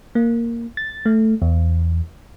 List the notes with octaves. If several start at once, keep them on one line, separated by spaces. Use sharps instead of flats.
A#3
A6
A3
E2